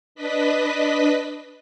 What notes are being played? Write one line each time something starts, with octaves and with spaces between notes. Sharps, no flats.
D4 B4 D#5 B6